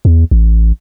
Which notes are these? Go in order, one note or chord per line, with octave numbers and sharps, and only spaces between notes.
E2
A1